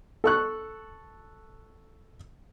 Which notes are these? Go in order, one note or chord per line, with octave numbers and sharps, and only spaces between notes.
A4 C#6 F#6